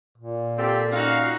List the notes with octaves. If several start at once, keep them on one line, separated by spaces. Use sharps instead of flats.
A#2
C4 F4 G4 A4
C#4 D#4 F#4 F5